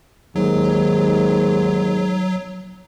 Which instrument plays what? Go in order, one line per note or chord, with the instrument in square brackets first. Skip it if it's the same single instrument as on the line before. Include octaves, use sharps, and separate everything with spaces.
[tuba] D#2 [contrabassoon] G#2 [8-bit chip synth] F#3